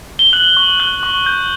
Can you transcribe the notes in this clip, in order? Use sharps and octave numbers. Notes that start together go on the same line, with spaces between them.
G7
F#6 F#7
C#6
F#6 G7
C#6
G6